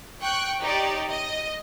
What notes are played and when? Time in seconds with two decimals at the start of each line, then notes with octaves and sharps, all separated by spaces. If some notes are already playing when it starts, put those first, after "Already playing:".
0.21 G5 C#6 F#6
0.60 D#4 G4 C#5 D5
1.08 D#5